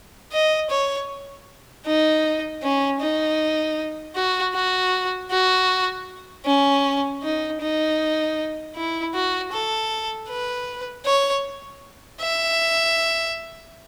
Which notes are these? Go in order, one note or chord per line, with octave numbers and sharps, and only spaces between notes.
D#5
C#5
D#4
C#4
D#4
F#4
F#4
F#4
C#4
D#4
D#4
E4
F#4
A4
B4
C#5
E5